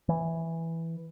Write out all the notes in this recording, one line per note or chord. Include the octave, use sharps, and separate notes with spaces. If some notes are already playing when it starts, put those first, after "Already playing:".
E3